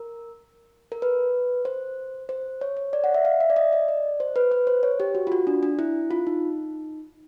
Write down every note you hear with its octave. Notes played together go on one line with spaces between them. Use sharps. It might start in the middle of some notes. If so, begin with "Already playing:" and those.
Already playing: A#4
A#4
B4
C5
C5
C#5
C#5
D5
F#5
E5
F5
E5
D5
D#5
D#5
D5
C5
B4
B4
C5
C#5
G4
F#4
F4
F#4
D4
D4
E4
F4
D#4